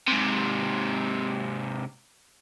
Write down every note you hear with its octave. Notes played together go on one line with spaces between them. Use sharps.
G#2 C3